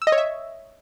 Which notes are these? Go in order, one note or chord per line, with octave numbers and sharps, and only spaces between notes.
E6
D#5
C#5
E5